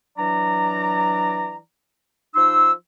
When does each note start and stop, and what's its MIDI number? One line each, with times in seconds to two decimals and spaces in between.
0.18 1.58 52
0.18 1.58 54
0.18 1.58 62
0.18 1.58 74
0.18 1.58 82
2.35 2.72 53
2.35 2.72 63
2.35 2.72 84
2.35 2.72 88